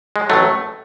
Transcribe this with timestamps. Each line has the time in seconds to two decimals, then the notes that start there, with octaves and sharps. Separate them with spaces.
0.16 G#3
0.29 A1 A2 F#3 A3